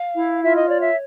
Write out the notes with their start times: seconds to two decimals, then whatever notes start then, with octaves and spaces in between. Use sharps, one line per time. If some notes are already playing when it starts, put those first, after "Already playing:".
Already playing: F5
0.16 E4
0.42 F4 E5
0.56 D#5
0.68 C#5 D5
0.81 E5